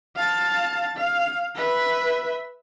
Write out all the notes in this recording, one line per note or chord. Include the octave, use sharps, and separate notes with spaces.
F5 A5
F5
B4 E5